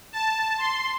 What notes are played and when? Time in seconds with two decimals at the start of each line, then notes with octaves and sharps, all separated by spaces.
0.13 A5
0.58 C6